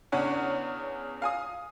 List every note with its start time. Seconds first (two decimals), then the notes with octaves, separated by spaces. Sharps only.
0.12 E2 C#3 D4 C#5 F#5 G#5
1.22 F5 G#5 D#6